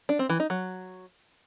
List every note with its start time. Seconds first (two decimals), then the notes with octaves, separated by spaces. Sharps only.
0.09 D4
0.19 C4
0.29 E3
0.40 D#4
0.50 F#3